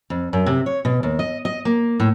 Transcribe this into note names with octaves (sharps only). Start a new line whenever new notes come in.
F2
F#2
C3
C#5
B2
D#2
D#5
D#5
A#3
A2